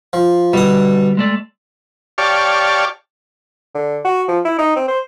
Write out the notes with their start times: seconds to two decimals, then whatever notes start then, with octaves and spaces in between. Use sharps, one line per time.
0.13 F3
0.53 B2 D3 G3 D#6
1.17 G#3 A3 D5
2.18 G4 C#5 D5 F5 A5
3.74 D3
4.05 F#4
4.28 F3
4.45 E4
4.58 D#4
4.76 C4
4.88 C5